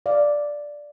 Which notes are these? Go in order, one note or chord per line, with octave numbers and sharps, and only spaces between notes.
D5 F5